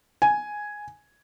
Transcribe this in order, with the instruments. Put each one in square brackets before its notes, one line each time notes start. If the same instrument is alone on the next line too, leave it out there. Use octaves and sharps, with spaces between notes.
[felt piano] G#5